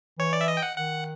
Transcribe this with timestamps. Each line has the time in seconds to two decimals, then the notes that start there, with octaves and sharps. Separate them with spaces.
0.18 E3 C#5
0.33 D5
0.41 E5
0.48 D#5
0.57 G5
0.63 F#5
0.76 D#3 F#5